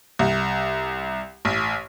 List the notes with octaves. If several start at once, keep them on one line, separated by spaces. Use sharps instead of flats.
C2
A1